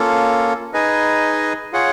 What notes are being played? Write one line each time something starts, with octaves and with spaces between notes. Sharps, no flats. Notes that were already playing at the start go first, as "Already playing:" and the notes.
Already playing: A#3 C#4 F4 A4
D#4 G#4 B4 D#5 G#5
F4 G#4 C#5 F#5